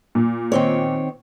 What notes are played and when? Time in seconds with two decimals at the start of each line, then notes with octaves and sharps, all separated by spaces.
0.15 A#2
0.52 D#3 C4 C#5